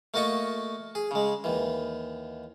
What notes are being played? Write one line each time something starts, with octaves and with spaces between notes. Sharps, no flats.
A3 A#3 F#4 D#5 A5 C#6
G#4
C#3 G#3
D#2 E3